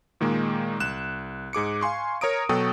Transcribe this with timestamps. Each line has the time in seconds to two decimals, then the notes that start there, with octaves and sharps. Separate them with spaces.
0.21 A#2 D#3 G#3 A#3
0.80 C2 F#6 E7
1.53 G#2 G#4 D6 C#7
1.81 F5 G#5 C6 C#6
2.21 A#4 C#5 A#5 D#6 D7
2.49 B2 F#3 A4 G5 C#6 D#6